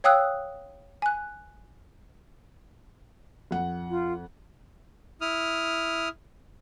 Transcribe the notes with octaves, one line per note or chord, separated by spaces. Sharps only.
C#5 F5 G5 D#6 E6 F#6
G#5 F#6
F2 F#5
F4
E4 D#6 F6